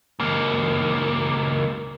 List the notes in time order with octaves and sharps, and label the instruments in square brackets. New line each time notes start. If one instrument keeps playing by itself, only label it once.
[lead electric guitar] C#2 A#3